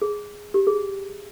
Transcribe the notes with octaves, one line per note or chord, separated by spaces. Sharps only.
G#4
G4
G#4